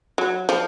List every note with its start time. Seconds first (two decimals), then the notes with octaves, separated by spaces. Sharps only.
0.18 F#3
0.49 F3